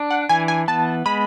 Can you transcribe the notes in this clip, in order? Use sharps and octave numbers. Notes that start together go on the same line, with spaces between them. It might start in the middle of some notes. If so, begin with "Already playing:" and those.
Already playing: D4
F#5
E3 G#5
G#5
B3 A5
G#3 B5